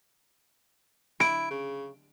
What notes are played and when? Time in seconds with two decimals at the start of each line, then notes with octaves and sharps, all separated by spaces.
1.20 E4 D7
1.51 C#3